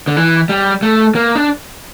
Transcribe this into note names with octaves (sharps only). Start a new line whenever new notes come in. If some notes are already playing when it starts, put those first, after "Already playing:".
D3
E3
G3
A3
A#3
D4